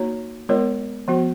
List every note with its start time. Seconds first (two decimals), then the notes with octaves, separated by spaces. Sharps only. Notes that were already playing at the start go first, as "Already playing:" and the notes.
Already playing: A#3 D#4 F#4 C#5
0.49 G#3 B3 F4 A#4 C#5
1.08 F3 B3 F#4